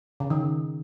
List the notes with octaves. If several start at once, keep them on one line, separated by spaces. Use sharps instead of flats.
C#3
D#3